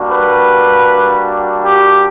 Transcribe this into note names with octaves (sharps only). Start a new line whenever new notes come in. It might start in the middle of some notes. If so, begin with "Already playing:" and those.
Already playing: G3 A#3 D4 F#4
B4
G4